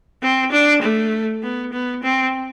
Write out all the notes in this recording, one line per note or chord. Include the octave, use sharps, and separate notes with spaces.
C4
D4
A3
B3
B3
C4